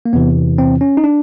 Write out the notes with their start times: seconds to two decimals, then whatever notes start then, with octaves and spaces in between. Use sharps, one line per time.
0.06 A#3
0.13 E2 C3 E3 B3
0.58 C4
0.81 C#4
0.97 D#4
1.04 D4